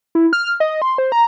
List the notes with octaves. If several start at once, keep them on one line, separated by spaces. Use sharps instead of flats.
E4
F6
D#5
C6
C5
A#5